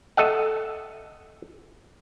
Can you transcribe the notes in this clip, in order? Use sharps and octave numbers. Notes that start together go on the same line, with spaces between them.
A4 D#5 E5 F#5